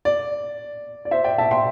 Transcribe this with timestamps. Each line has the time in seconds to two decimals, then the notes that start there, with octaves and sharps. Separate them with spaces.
0.05 D5
1.05 D5
1.11 C5 E5
1.24 D5 G5
1.38 E5 A5
1.51 G5 C6